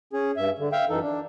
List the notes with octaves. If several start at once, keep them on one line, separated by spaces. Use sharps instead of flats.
C#4 G#4
G2 E5
D3
E5 F5 G5
F#2 E3 D#4 A4
D4